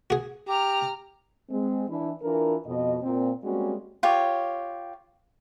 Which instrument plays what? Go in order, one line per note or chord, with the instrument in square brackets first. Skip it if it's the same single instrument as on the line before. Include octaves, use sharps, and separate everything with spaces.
[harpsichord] F#4 G#4
[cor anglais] G4 [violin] A#5 F6
[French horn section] G#3 C4
E3 D4 E4
E3 D4 F4 A#4
F2 B2 D#5
A#2 C4
G3 G#3 A#3 C4 C#4 F#4
[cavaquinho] F4 G4 C#5